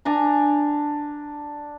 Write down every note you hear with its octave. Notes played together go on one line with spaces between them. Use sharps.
D4 G#5 A#5